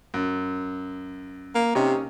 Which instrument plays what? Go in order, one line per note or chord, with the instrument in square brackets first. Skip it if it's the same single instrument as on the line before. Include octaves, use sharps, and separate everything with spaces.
[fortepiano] F#2
[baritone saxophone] A#3
[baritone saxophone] C3 [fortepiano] C#4 D#4